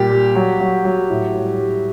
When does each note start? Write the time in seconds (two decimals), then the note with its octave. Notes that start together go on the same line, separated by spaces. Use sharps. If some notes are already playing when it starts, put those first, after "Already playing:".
Already playing: A#2 G3 G4
0.10 G3
0.35 F#3
0.60 F#3
0.85 F#3
1.10 A2
1.35 G3
1.60 G3